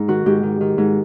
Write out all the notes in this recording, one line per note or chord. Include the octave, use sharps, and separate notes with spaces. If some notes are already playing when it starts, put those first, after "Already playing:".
Already playing: G#2 D#4
D#3 F#4
G#2 G4
D#3
D#3
G#2